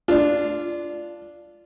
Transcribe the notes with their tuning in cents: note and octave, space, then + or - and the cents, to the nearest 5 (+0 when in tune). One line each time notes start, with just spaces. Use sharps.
D4 +0 F4 -15